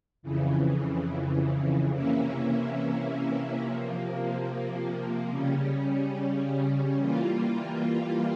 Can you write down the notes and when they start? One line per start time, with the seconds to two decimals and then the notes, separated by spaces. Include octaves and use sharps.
0.23 F2 C#3 E3
1.91 C3 E3 A#3 C#4 E4
3.60 C3 F3 A#3
5.29 C#3 G3 C#4
6.98 E3 G3 A#3 F4